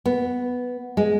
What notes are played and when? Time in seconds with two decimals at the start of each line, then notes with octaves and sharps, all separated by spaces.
0.06 B3
0.97 G#3